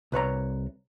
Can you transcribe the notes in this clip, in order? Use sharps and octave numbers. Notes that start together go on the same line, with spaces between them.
C2 B4 C#5 A#5